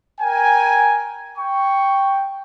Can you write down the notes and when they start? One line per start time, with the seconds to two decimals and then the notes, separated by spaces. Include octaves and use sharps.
0.21 A#4 G5 G#5
1.38 G5 C#6